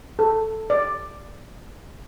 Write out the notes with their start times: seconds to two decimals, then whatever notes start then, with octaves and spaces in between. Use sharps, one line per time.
0.19 A4
0.70 D5